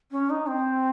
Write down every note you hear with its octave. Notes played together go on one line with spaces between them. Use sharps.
C#4
D#4
C4